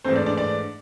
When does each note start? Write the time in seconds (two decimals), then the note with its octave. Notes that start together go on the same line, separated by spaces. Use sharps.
0.04 G#2 E3 A3 C4 C5
0.16 D4 D5
0.26 D4 D5
0.37 D4 D5